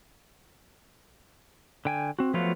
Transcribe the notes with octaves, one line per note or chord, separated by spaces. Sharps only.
D3 G5 G#5
C4 F#4
F3 F#3 A3 B3 F4 F#4